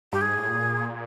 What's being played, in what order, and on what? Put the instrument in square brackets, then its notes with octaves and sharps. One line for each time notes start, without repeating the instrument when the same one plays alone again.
[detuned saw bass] G2 [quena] G4
[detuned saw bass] G#2 [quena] G#4
[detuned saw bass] A2
A#2